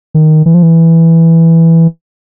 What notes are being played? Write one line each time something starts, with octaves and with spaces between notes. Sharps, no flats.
D#3
E3
F3
E3